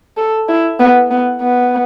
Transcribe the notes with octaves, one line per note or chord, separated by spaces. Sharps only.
A4
E4
B3
B3
B3